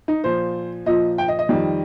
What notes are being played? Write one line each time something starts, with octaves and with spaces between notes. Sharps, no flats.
D#4
A#2 F3 C5
A#2 F3 D#5
G5
D#5
D#5
F2 D#3 G3